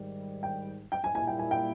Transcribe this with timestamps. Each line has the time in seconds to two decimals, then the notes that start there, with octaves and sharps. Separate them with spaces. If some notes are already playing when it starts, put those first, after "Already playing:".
Already playing: G#2 D#3 G3
0.43 G5
0.92 G5
1.04 G#5
1.15 A#2 G3 A#3 E4 G#5
1.27 G5
1.39 G#5
1.51 G5